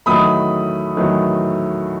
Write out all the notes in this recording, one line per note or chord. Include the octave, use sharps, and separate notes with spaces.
E2 D#3 F#3 A3 B5 D#6
E2 D#3 F#3 A3